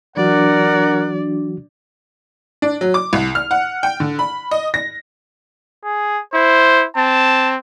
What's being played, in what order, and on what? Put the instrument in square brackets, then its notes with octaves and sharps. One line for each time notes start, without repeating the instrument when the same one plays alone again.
[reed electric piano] E3 F#3 F#4 [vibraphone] D4 D6 [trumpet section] A#4 F#5 [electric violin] D5
[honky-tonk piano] D4
F#3
D6
C2
F6
F#5
G5
D3
B5
D#5
A#6
[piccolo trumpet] G#4
[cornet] E4 [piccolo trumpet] C5
[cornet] C4 [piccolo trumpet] A5